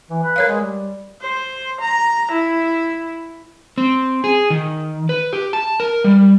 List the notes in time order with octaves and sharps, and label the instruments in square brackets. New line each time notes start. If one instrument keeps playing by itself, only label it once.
[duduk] E3
B4
[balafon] A#4 C#5 F5
[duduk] G#3
G3
[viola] C5
A#5
E4
[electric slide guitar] C4
G#4
D#3
B4
G4
A5
A#4
G3